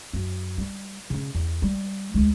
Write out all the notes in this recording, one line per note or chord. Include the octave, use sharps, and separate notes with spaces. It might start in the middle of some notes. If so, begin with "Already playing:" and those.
F#2
G3
C#3 C#4
E2
G3
D2 G#3